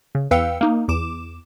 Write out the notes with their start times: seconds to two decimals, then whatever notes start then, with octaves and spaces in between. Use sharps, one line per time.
0.15 C#3
0.31 E2 B4 F5 G5 E6 C#7
0.61 A#3 D#4
0.88 E2 D6 E7